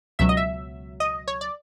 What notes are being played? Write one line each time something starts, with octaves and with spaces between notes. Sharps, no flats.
C#2 B2 F#3 E5
D#5
E5
D#5
C#5
D5